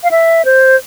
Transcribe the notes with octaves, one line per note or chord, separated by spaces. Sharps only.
F5
E5
C5